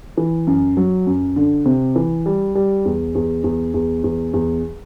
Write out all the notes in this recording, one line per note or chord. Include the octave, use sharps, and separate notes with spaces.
E3
F#2
F#3
F#2
D3
C3
E3
G3
G3
E2
E2
E2
E2
E2
E2